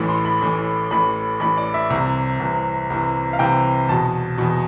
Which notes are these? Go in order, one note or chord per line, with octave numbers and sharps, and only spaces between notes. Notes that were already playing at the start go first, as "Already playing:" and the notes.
Already playing: A1 A2 E3 B5
C6
B5
A1 A2 E3
A1 A2 E3 B5
A1 A2 E3 B5
D5
E5
C2 C3 E3
C2 C3 E3
C2 C3 E3
F5
C2 C3 E3 G5
E2 B2 A5
E2 B2